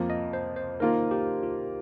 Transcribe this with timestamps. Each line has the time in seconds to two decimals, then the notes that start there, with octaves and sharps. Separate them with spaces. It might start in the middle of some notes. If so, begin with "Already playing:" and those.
Already playing: F2 F3 A#3
0.10 D#5
0.33 C5
0.56 C5
0.80 D#3 A#3 F4 A#4
1.11 G4
1.43 F4